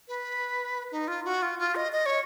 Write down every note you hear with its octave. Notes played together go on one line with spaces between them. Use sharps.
B4
D#4
F4
F#4
F4
F4
D#5
D#5
C#5